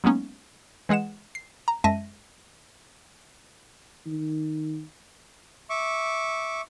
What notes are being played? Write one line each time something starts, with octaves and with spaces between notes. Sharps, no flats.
F#3 G#3 A#3 B3 C#4 D#4
E3 G#3 G#4 F#5 E7
C7
A#5
F#2 G#3 E5 A5 A#6 D#7
D#3
E5 C#6 D6